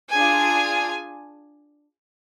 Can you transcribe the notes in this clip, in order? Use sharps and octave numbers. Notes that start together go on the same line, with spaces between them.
D4 F4 G#4 G#5